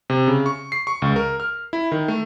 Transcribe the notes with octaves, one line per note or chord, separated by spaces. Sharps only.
C3
C#3
C#6
C7
C#6
C#2
A#4
F6
E4
D#3
A3